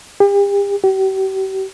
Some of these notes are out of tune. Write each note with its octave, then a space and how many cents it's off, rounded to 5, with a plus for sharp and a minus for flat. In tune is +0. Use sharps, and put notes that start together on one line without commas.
G4 +40
G4 -40